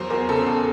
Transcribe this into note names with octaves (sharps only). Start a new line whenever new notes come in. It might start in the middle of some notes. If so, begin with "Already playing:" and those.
Already playing: E2 F#3 A#4 C5
E2 A#4
C#3 A4
E2